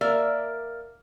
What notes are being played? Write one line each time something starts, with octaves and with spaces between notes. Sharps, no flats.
A#3 A#4 D5 E5